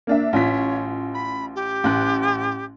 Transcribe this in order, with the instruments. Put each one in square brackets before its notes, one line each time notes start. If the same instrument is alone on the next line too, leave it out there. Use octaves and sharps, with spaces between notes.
[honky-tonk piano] A#3 D4 E5
[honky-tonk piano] A1 F4 B6 [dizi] C#5
[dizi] B5
G4
[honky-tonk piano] A1 F#6